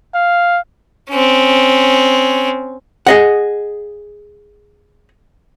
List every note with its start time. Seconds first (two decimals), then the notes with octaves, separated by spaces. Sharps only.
0.15 F5
1.10 C4 C#4
3.07 G#4 D#5 F#5